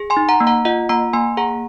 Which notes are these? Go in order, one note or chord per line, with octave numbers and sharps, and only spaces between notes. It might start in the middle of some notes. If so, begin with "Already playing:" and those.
Already playing: G#4
G#5 C6
D#4
F#5 A#5
A#3
F#5 A#5
F4 D#5 F#5
A#3 F#5 A#5
A#3 G#5 C6
G#4 F#5 A#5